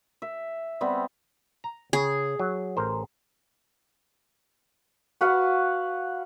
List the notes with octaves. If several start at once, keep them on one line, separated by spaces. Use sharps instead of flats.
E5
G3 B3 C4
A#5
C#3 G#4
F#3
A1 A#4 C5
F#4 B4 F5 F#5